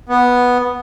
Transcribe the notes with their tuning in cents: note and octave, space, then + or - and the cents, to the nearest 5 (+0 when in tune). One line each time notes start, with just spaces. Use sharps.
B3 -5